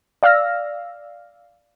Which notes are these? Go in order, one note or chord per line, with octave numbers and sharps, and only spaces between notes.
D5 F5 E6 F6 A#6